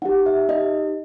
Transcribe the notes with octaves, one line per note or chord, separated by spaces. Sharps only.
D#4 G4 F#5
E5
D#4 G4 D#5